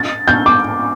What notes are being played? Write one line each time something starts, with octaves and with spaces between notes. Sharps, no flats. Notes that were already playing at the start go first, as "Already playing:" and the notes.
Already playing: A6
G6
D6